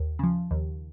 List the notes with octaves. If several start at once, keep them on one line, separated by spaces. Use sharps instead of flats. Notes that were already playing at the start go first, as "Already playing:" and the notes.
Already playing: D#2
C#3 F3
D#2